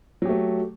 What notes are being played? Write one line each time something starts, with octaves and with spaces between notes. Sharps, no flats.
F#3 A3 G4